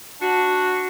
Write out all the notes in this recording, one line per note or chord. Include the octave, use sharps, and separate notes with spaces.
D4 F#4